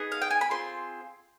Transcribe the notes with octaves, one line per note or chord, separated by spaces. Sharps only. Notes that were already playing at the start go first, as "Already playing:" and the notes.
Already playing: B3 D#4 G#4
F5
G5
G#5
B5
C4 F4 G#4 C6